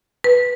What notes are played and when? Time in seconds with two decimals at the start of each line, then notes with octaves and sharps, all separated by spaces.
0.24 B4